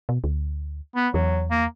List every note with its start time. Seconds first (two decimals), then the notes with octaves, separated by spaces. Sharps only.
0.09 B2
0.24 D2
0.96 B3
1.14 E2 F#3
1.51 A#3